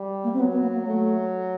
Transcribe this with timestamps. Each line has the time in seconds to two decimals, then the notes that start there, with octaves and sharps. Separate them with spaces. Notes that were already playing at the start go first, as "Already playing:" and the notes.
Already playing: G3
0.24 A#3
0.33 C4
0.39 F#3 B3
0.51 B3
0.62 A#3
0.74 A#3
0.86 F#3 A3